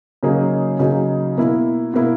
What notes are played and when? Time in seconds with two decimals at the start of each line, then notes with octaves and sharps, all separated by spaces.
0.23 C#3 F#3 A#3 D#4 G#4
0.79 C#3 F#3 A#3 D#4 G#4
1.37 B2 A#3 E4
1.93 B2 A#3 E4